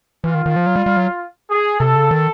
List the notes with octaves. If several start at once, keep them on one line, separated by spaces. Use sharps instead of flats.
E3 F4
D#3
D#3
F3
F#3
G3
G3
F#3
G#4
C3 A4
C#3
D#3